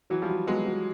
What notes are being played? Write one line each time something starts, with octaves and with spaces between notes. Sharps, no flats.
E3 F#3 F#4
F3 G3
F#4
F#3 G#3 B3
F#4